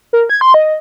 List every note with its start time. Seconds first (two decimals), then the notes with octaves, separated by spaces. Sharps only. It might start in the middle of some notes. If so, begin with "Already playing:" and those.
0.13 A#4
0.30 G#6
0.41 C6
0.54 D#5